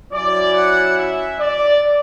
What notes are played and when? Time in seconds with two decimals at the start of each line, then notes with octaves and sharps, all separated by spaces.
0.12 F#3 C#4 E4 D5
0.54 F#5
0.97 E5
1.40 D5